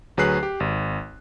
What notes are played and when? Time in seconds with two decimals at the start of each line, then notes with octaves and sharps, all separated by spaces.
0.17 D2 F#3 G#4 B4 F#6 C7
0.43 G4
0.60 G#1